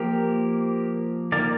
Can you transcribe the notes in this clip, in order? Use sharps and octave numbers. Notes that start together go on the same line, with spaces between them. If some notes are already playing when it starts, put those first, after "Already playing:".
Already playing: F3 A#3 G4 A#4
D#3 A#3 A#4 D5